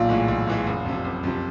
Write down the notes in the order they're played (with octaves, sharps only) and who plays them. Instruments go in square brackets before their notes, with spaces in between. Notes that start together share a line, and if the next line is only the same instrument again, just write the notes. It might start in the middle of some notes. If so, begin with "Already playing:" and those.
Already playing: [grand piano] B1 [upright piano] A#2
[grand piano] A2 E3 G#3
B1
A2 E3 G#3
F#1
F2 C3
F#1
F2 C3